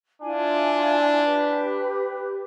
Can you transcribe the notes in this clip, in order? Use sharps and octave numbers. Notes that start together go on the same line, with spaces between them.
D4 E4 F4 G#5
G4 B4